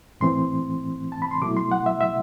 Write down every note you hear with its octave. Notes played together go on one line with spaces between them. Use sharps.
A2 E3 A3 C4 C6
A5
B5
C6
B2 F#3 A3 E4 D6
C6
F#5
E5
E5